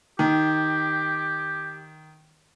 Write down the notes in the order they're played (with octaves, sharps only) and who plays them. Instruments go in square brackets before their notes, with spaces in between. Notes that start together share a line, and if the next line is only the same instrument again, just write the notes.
[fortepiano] D#3 [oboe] G4